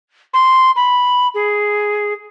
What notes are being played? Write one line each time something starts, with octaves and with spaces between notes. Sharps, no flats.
C6
B5
G#4